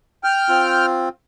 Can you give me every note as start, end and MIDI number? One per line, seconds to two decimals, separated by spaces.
0.24 0.86 79
0.24 0.86 89
0.49 1.09 60
0.49 1.09 65